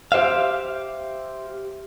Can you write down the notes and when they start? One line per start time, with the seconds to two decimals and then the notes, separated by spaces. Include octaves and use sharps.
0.12 G4 C5 E5 F5